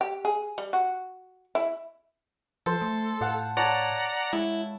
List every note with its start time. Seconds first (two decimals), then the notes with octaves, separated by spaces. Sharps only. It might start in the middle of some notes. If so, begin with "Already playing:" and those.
0.01 G4
0.25 G#4
0.58 G3
0.73 F#4
1.55 E4
2.66 F3 A4 C5 C6
2.82 A3
3.21 A2 F5 F#5 A5
3.57 C#5 D5 F#5 A5 A#5
4.33 G#3 E4